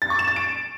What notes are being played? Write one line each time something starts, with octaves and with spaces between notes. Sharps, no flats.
A6
C#6
E7
A6
D7